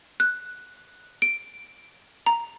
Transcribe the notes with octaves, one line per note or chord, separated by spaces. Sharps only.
F#6
D7
A#5